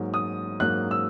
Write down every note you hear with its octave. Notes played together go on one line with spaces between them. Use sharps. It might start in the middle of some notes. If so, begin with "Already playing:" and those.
Already playing: G#2 F#3 A#3
D#6
G#2 F#3 A#3 F#6
E6